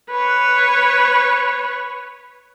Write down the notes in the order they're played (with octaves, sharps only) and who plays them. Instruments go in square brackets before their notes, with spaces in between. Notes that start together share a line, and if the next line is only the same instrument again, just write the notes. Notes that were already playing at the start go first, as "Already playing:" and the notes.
[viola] B4 C#5